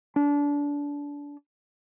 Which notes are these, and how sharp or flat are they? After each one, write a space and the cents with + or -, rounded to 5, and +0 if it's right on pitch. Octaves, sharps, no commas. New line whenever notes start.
D4 -25